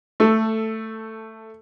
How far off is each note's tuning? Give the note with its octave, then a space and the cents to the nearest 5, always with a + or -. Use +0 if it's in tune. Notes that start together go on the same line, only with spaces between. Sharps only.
A3 +10 A4 +0